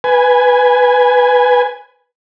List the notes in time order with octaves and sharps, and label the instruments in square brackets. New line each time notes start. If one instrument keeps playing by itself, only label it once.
[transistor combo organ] B4 G#5